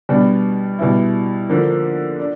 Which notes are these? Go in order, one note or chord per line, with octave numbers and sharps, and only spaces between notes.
B2 G3 B3 D4
B2 G3 B3 E4
D3 F3 A#3 D4
D4